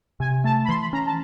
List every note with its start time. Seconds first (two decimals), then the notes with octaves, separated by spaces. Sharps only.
0.20 C3 G#5
0.44 A3 A5
0.64 B5
0.69 E3 C6
0.81 B5
0.93 C#4 A#5
1.06 A5